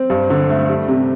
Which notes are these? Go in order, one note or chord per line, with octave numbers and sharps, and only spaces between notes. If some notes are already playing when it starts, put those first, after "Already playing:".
Already playing: C4
G2
D3
A3
G3
C3